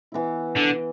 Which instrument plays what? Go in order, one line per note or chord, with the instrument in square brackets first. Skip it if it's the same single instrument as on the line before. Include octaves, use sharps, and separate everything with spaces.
[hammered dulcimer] E3 B3 E4
[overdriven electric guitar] D3